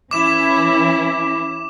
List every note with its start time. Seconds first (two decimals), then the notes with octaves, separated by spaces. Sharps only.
0.11 E3 C#4 E4 D6 E7